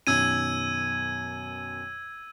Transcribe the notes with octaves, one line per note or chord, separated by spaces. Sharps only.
F#2 B2 D#3 E6 G#6 D#7